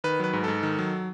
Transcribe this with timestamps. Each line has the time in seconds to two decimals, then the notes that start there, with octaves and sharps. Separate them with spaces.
0.04 D#3 B4
0.20 F#3 B4
0.33 G#2
0.44 G#2 A4
0.63 D#3
0.79 F#3